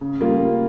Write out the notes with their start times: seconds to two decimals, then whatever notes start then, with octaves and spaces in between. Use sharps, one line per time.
0.01 C#3
0.20 G3 A#3 F4
0.40 C#3